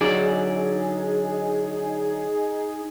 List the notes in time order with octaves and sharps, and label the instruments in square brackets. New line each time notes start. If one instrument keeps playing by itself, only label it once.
[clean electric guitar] D3 F#3 D5 [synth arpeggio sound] D#4 G#4